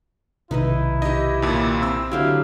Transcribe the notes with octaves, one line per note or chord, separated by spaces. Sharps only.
B1 C3 D#3 D#4 E4 B4 D#5
D#4 G4 D#5
D#2 A#2
C4 E6
D3 F#3 E4 G4 F5